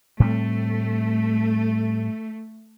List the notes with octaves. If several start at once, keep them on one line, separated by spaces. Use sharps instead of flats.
A2 G3 A3 C4